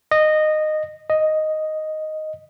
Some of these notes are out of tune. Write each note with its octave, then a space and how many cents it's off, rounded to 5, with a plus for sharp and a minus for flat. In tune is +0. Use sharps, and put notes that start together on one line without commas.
D#5 -15
D#5 +0